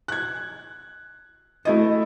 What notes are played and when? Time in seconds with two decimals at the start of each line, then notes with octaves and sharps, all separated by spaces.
0.08 F#6 G#6
1.65 A3 E4 D#5